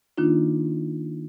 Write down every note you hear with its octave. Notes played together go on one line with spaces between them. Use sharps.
D#3 A#3 D4 D#4 F4